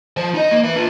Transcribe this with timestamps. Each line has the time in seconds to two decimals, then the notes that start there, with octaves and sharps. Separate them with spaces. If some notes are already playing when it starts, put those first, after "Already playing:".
0.17 F3 C5
0.34 D#4 D#5
0.51 A#3
0.64 E4 B4
0.76 D4 F4